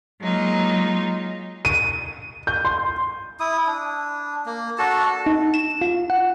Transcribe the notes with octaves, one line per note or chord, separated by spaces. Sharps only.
F#3 G#3 A#3 D#4 F4
D#7
G6
C6
E4 D#6
D4
A#3
D4 F#4 A4 A5
D#4
E7
F4
F#5